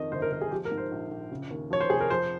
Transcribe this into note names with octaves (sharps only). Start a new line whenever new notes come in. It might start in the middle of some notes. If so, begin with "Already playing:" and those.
Already playing: F2 D#3 D#5
G1 C5
A#4
G1 A#4
G#4
F3 G4
A#4
G#2
C5
A#1
A#1
C#3
D#2
F3 C#5
C5
F1 G#4
A#4
F3 C5